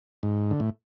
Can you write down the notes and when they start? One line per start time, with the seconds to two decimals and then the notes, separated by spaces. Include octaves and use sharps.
0.23 G#2
0.51 D3
0.60 A2